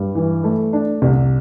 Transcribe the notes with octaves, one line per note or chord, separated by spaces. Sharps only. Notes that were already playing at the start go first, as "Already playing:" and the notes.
Already playing: G2
E3
A3
D4
C2